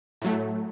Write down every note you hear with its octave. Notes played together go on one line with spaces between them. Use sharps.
A2 F#3 A3